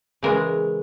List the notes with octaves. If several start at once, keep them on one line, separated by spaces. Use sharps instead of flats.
C#3 E3 G#3 A#4